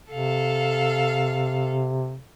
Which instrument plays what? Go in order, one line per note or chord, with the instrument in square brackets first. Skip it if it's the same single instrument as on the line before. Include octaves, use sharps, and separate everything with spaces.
[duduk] C3 [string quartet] A4 F5